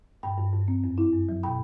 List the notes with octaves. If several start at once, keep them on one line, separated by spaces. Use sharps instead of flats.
G2 G5 B5
G2
G2
C4
F#2
E4
F#2
F#3
B2 G5 B5